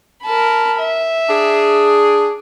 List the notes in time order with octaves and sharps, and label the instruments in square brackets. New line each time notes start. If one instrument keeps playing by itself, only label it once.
[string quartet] A#4 A5 B5
E5
[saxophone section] D4 G#4